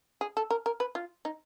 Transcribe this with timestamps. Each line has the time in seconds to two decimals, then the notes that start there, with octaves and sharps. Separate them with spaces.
0.21 G#4
0.37 A4
0.51 A#4
0.66 A#4
0.80 B4
0.95 F4
1.25 D#4